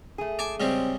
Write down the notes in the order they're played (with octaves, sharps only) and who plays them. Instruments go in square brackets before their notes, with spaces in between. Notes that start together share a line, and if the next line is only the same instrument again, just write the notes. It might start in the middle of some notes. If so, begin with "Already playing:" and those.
[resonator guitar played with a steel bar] A3 G#4
[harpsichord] G#5 A5 D6
[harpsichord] C#3 G3 G#3 [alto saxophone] C4